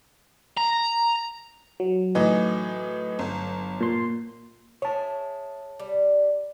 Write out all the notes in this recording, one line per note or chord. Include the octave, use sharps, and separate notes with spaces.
A#5
F#3
A2 E3 D#4
G1
A#2 C6
G#4 C#5 E5 A5
G3